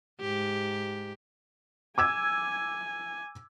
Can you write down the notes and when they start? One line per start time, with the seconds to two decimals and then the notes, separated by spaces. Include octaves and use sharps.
0.21 G#2 G4
1.98 G#5 D6 E6 G#6